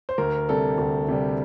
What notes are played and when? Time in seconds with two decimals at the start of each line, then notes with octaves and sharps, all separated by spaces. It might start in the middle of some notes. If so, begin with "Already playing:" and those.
0.09 C5
0.18 D2 A#4
0.49 C3 G3 A4
0.78 D2
1.08 C3 G3